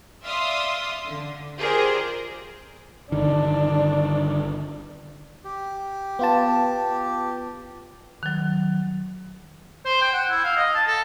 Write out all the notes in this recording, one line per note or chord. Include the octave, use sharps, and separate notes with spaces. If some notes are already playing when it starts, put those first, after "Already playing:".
D5 E5 F5 C6 D#6
D3
F4 G4 G#4 A#4 C5 D5
G1 D3 D#3 D4
G4
B3 F4 A5
D#3 F#3
C5
G5
F#5
E4
F5
D#5
A5
A4